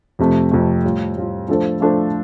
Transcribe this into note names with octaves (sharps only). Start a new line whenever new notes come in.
F2 C3 A3
F2 C3 A3
A2 G3 F4
A2 G3 F4
F3 A3 D4 A4 C5
F3 A3 D4 A4 C5